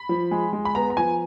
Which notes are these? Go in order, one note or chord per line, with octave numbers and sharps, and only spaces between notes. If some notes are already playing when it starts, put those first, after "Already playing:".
Already playing: B5
F3
G#3
G#3
B5
B3 A#5
A#5
F3 G#5